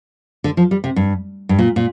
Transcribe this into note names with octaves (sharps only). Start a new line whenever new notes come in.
D3
F3
G3
C3
G2
G2
A#2
A#2